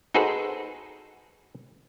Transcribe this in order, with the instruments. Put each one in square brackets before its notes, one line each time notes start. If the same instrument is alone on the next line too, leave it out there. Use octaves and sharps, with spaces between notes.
[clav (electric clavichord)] D#4 F#4 G#4 A4 B4 C5